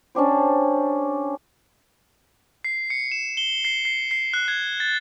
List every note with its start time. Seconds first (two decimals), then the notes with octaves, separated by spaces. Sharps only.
0.15 C#4 D4 G4 C5
2.64 C7
2.90 C#7
3.12 E7
3.37 G7
3.65 C7
3.85 C7
4.11 C7
4.33 F#6
4.48 G#6
4.80 A6